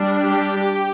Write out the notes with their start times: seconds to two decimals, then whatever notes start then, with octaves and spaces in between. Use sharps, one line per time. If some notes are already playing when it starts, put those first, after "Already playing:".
Already playing: G3 D4
0.22 G4